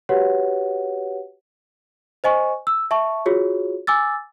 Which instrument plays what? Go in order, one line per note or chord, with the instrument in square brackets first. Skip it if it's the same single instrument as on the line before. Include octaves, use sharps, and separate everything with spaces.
[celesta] F#4 G4 B4 C#5 F#5
C5 D#5 G#5 C#6
E6
E5 A5 C#6
F4 F#4 G#4 C#5
G#5 D6 E6 A6